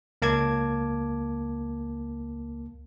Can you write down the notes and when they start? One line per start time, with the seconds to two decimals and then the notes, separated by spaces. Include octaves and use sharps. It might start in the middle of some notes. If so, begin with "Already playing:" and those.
0.22 C#2 A#3 A5 D6 G#6